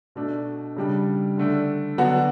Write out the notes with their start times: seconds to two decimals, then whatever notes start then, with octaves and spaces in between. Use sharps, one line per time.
0.16 B2 A3 D4
0.76 C#3 G3 D4
1.37 D3 A3 D4
1.98 D3 F#3 B3 D4 F#4